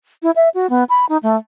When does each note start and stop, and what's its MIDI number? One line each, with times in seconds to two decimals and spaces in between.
0.23 0.31 64
0.36 0.49 76
0.54 0.69 66
0.70 0.84 59
0.89 1.05 83
1.09 1.17 63
1.23 1.36 57